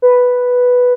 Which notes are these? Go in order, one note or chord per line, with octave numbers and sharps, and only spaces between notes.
B4